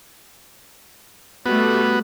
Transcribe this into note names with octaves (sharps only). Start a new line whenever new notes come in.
G3 A3 B3 F#4